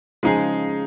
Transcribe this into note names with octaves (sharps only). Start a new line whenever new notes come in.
C#3 F3 G#3 D#4 G#4